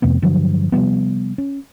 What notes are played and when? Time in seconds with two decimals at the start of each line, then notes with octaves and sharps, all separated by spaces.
0.02 F2 C3 A3 B3
0.22 G2 D3 F3 F#3
0.72 C3 F3 G3 B3
1.38 C#4